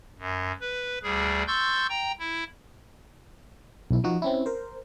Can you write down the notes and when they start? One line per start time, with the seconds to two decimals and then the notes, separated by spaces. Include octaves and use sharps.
0.19 F#2
0.61 B4
1.03 D2 G3 G#4
1.47 C6 C#6 E6 G6 A6
1.90 G5 A#5
2.19 E4
3.91 B1 E4
4.04 F3 D#4 F#4
4.22 C4 C#4 E4
4.46 A#4 C5